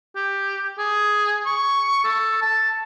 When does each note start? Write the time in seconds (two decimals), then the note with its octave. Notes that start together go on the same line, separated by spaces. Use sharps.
0.16 G4
0.78 G#4
1.46 C#6
2.04 A4
2.42 A5